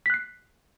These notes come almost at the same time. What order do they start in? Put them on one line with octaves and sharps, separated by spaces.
B6 F#6 C7